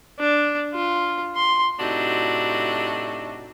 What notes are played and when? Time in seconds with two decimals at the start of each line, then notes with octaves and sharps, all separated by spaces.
0.19 D4
0.73 F4
1.35 C6
1.80 A2 C3 D4 D#4 F#4